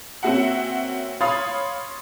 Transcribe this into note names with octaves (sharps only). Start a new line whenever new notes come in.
A#3 C4 C#4 F#4 E5 F#5
C#5 F5 B5 C6 D#6 A6